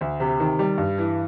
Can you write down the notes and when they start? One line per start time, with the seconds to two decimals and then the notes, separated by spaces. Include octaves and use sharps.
0.01 D2
0.20 C3
0.40 D#3
0.59 G3
0.78 G2
0.98 E3